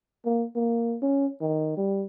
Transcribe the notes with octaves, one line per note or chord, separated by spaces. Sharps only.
A#3
A#3
C#4
D#3
G3